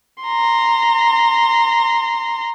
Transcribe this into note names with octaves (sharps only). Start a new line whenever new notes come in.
A#5 C6